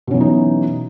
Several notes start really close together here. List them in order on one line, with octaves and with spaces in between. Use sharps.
B2 C#4 F#3 E3 D#4